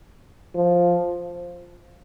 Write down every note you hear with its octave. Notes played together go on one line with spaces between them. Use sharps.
F3